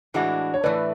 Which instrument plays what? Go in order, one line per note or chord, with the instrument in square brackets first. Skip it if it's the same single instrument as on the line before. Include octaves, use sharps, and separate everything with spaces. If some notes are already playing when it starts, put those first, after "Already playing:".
[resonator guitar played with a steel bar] A2 E3 G#3 D4 F#4
[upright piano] C#5
[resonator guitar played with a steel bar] A2 E3 A3 [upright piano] B4 D5